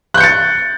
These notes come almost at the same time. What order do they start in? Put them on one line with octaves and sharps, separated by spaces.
F#6 G6 C#7 A6